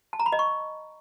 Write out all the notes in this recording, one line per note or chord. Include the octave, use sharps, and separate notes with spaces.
A5
A#5
B5
D#5
C#6